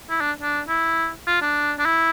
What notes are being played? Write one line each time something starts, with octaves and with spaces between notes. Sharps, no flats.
E4
D4
D4
E4
F4
D4
D4
E4